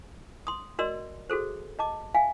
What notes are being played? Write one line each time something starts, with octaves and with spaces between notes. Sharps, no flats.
C6 D#6
F#4 A#4 D5 D#5 C6 E6
F#4 G#4 A4 C5
D#5 A5 D6
E5 F5 G#5